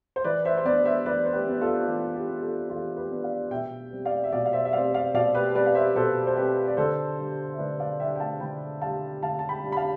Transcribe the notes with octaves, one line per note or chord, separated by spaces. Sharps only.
C5
E3 B4 D5
C5 E5
C5
B3 D4 B4 D5
C5 E5
E3 B4 D5
C5
G4 B4
B3 D4
F4 A4
F4
E3 G4
G4
B3 D4
F4 A4
E3 F4 A4
G4 B4
B3 D4
D5 F5
B2 E5 G5
G3 C4
D5 F5
E5
B2 D5 F5
F5
C5 E5
E5
G3 C4 D5 F5
D5 F5
B2 D5 F5
G4 B4
G3 C4 B4 D5
F5
C5 E5
B2 A4 C5
C5
G3 C4 G4 B4
D5
D3 A4 C5
G3 D4
E5
D3 B4 D5
D5 F5
G3 D4 E5 G5
G5
F5 A5
D3 G5 B5
G3 D4 F5 A5
D3 F5 A5
A5
G5 B5
G3 D4
B5
F5 A5